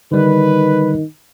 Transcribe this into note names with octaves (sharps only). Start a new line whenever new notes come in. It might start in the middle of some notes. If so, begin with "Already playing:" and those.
D3 D#3 G3 B4